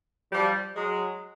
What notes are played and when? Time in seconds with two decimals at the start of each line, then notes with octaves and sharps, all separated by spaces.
0.32 F3 G3
0.76 F#3 G#3